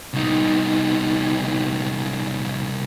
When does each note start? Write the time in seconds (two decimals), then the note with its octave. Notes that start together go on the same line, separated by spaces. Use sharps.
0.13 C2 D#4